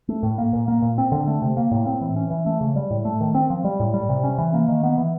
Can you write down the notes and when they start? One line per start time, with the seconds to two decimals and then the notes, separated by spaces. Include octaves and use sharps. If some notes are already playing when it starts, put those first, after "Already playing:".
0.09 A3
0.23 A2
0.38 A#3
0.53 A#2
0.68 A#3
0.82 A#2
0.98 C4
1.12 D3
1.27 A3
1.42 C3
1.57 A#3
1.71 A2
1.86 C4
2.01 E3
2.16 C#4
2.30 E3
2.46 A3
2.61 C#3
2.76 G3
2.90 A2
3.05 A3
3.20 D#3
3.34 C4
3.50 F3
3.64 G3
3.80 A2
3.94 G3
4.09 C3
4.24 C#4
4.38 E3
4.54 A#3
4.68 D#3
4.83 B3
4.98 E3